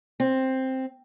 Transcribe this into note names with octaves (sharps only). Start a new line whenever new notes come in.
C4